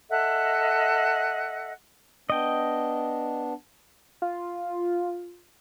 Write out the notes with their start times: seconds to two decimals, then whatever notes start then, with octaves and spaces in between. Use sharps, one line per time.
0.09 A4 D#5 E5 F#5
2.30 B3 D4 D#5 G5
4.22 F4